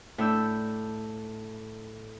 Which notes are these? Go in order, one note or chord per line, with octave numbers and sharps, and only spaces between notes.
A2 D4 E6 G6